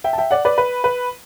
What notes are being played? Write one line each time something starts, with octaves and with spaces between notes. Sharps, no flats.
E5 G5
A5
E5 G5
D5 F#5
B4 D5
B4
B4